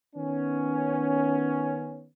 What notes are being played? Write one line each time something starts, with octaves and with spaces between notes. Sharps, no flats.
D#3 B3 C#4